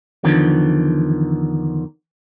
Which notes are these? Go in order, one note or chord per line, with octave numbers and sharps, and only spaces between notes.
E2 D3 D#3 F3